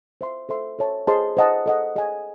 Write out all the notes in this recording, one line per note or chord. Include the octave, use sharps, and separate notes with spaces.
C5 E5 C6
A4 C5 E5 C6
A4 C#5 E5 A5
G#4 C5 D#5 A5 C6
C5 D#5 F#5 A5
A4 D#5 F#5
G#4 D#5 G#5